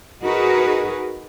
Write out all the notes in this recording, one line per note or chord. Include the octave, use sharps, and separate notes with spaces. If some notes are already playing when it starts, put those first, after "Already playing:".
D#4 F#4 G#4 A#4 B4